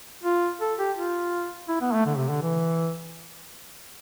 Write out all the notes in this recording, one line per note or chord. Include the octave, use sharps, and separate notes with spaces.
F4
A4
G4
F4
E4
B3
A3
D3
C3
D3
E3